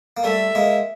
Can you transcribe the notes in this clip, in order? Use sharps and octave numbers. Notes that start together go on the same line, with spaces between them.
A#3
G3 A3 E5
G#3 A#3